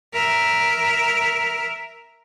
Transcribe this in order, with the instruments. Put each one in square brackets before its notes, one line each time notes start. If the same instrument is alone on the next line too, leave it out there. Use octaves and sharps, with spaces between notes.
[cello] A#4 E5